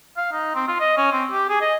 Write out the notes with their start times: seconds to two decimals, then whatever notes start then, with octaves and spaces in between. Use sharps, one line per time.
0.17 F5
0.32 D#4
0.55 C4
0.68 F4
0.80 D#5
0.97 C#4
1.12 C4
1.32 G4
1.50 G#4
1.61 D#5